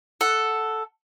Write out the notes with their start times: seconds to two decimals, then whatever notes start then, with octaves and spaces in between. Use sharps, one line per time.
0.21 A4 F#5